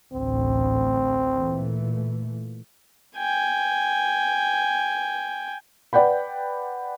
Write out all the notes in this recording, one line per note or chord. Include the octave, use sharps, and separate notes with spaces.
A1 D2 C4
A#2 E3 A3
G5 G#5
B4 D5 F#5 G5 B5